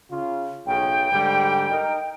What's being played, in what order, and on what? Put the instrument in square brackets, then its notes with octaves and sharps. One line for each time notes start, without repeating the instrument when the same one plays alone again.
[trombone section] C#3 F4
[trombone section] B1 C#3 [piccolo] G5
[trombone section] G#2 D3 G3
D#4 A#4